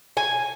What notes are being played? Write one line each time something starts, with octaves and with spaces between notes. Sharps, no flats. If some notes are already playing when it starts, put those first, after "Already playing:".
G#5